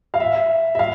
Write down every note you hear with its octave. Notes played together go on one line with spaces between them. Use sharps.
F5
E5
E5
F5